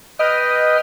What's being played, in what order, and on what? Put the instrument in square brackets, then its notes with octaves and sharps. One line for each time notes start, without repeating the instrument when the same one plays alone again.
[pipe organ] B4 G5 F6 [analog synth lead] D#5